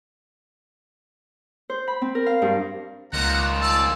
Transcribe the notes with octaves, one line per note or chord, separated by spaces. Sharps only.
C5
B5
C4
A#4
F5
G2
C#2 D#3 F4 F#5 A#5
D5 A5 E6